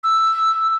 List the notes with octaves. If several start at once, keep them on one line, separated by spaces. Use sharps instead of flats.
E6